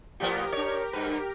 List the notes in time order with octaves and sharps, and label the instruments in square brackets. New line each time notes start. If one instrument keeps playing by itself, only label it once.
[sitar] A2 F3 B3 [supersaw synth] G4 A#4
[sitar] D4 C#5
G2 B4